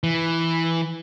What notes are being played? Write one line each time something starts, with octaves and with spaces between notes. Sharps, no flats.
E3